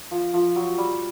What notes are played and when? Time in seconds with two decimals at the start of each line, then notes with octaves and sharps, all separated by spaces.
0.11 F3
0.34 F3
0.56 F#3
0.78 G3